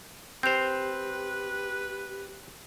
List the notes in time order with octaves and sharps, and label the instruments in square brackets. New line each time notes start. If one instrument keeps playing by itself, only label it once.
[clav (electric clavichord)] C4 C5 [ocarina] G4 [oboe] B4 [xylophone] G6 F7